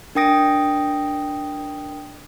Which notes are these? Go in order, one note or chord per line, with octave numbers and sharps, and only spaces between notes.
D4 A#4 G5 D#6 A#6 D7